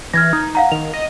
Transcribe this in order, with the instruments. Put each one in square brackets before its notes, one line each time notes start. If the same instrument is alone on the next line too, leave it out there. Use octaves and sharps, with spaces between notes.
[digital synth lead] E3 [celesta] F6 G#6 A#6
[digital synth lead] D#4
[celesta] F5 F#5 A#5
[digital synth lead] D#3 [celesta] F7
[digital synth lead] D#5